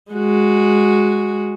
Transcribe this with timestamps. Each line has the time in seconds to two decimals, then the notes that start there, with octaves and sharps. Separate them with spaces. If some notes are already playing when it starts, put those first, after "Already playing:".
0.12 G#3 F#4